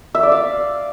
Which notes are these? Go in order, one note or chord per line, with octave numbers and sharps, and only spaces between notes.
E5
D5
F5